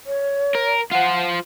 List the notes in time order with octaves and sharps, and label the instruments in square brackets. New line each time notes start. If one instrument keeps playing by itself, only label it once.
[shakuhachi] C#5
[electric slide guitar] A#4
[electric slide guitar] F4 C5 [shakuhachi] F#5